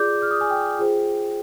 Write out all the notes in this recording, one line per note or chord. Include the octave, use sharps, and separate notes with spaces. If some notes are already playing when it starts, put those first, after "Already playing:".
Already playing: F4 G#4 D5 D6 G6
F6
D#6
G#5
G5
F4 G#4 C5